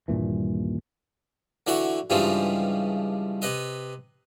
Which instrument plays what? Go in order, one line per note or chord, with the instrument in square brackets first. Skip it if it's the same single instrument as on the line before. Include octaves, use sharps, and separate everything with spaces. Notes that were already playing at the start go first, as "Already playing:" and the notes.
[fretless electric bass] D#1 G2 A#2 E3
[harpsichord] D3 E3 F#4 F#5 C#6
G2 C#3 E3 F3 G3 G#3
C3 B4 D#5